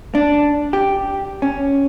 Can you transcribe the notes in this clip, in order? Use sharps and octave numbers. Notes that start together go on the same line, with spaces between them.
D4
G4
C#4